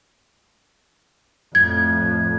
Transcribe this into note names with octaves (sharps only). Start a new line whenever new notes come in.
F2 A2 G#6